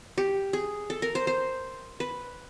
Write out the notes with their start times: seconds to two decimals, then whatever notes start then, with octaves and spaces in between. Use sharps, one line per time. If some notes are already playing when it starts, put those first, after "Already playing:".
0.18 G4
0.53 G#4
0.90 A4
1.02 A#4
1.15 C5
1.27 C5
2.00 B4